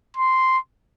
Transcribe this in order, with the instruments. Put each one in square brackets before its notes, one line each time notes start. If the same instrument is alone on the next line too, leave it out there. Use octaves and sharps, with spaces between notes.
[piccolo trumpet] C6